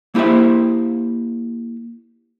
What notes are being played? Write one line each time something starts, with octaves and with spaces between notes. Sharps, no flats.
A#3 E4 G4 C5 E5